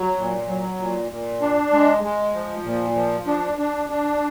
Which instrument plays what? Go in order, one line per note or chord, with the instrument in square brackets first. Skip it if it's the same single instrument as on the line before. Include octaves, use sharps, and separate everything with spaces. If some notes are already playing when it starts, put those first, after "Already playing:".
Already playing: [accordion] F#3
A#2
F#3
A#2
A#2
D4
G#3
G#3
F3
A#2
F3
D4
D4
D4